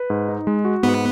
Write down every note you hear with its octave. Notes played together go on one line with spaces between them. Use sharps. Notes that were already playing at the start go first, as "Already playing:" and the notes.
Already playing: B4
G#2
D#4
G#3
F#4
G#2 B3